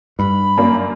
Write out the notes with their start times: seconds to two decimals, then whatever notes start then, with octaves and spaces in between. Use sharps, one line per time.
0.19 G2 B5
0.57 F#2 A#3 D5